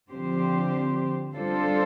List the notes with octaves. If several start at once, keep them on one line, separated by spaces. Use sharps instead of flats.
D3 F3 C4 G4 C5
G3 D4 F4 A4 C5